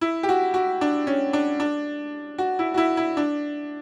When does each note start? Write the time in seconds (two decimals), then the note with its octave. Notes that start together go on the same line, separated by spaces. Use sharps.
0.01 E4
0.23 G4
0.29 F#4
0.54 F#4
0.81 D4
1.07 C#4
1.33 D4
1.60 D4
2.38 F#4
2.59 E4
2.74 F#4
2.77 E4
2.97 E4
3.17 D4